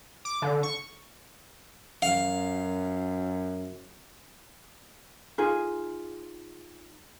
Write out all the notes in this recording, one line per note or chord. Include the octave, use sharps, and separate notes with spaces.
D6
D3
C#6
F#2 F5
D#4 F4 G#4